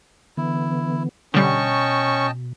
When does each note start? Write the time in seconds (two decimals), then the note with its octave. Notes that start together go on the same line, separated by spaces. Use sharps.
0.37 D3 E3 B3 E4
1.34 B2 D3 G3 C#4 D#5 G5 A5 C#6